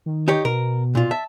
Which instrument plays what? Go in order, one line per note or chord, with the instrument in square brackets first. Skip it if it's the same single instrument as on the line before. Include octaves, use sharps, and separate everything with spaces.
[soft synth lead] D#3
[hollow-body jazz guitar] D#4 G4 C#5
[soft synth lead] B2 [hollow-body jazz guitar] A#4
[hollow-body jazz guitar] A#2 F4
[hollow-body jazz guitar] E5 [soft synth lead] A5